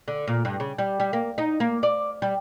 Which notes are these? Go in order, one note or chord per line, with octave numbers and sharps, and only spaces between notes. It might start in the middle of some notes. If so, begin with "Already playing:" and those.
D3
A#2
G2
C#3
G3
G3
A#3
D#4
A#3
D5
G3